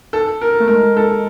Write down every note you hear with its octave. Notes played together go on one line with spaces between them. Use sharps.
A4
A#4
A3
G#3 A#4
A4